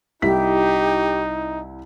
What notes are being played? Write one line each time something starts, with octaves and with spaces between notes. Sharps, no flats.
C2 D#4 E4 G4 B6